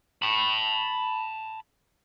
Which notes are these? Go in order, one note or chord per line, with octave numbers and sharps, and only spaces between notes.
A5 B5